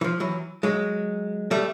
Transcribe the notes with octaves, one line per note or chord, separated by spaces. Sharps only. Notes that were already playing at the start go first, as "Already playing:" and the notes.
E3
F3
E3 F#3
F#3 G#3
G3 A3